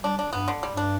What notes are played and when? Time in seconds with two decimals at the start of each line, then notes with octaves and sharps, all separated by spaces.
0.03 G3 D4
0.19 D4
0.33 G2 B3
0.48 D3
0.63 G3
0.71 G2
0.77 D4